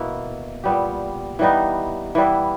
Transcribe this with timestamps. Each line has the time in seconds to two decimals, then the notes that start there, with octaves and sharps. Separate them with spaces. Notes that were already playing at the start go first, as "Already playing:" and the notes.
Already playing: B2 A#3 E4
0.64 A#2 G3 B3 G4
1.39 E3 G3 B3 D#4
2.15 E3 G3 B3 E4